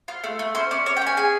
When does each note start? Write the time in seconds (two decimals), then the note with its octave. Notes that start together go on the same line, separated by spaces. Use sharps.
0.08 F4
0.24 A3
0.39 A3
0.55 C#4 C5
0.71 C#4 D5
0.86 C#4 C#5
0.97 G5
1.02 C#4 G#5
1.17 G#4 G#5